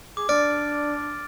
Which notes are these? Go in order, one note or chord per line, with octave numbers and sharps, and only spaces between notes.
G#4 D6
D4 D5 F6 A6 D7